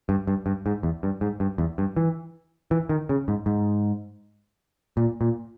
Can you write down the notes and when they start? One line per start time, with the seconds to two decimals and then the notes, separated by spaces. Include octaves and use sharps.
0.09 G2
0.27 G2
0.46 G2
0.66 G#2
0.83 E2
1.03 G2
1.21 G#2
1.40 G2
1.58 E2
1.78 G2
1.97 E3
2.71 E3
2.89 D#3
3.09 C#3
3.28 G#2
3.46 G#2
4.97 A#2
5.21 A#2